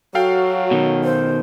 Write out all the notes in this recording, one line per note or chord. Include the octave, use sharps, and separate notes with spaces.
F#3 F#4 A4 F5 G5
B2 D#3
C5